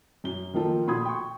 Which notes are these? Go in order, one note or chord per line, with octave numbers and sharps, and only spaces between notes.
F#2 G7
D#3 F3 A#3 F4 A4
A#2 F#4 B5 C6 D#6 G#6
G5 C#6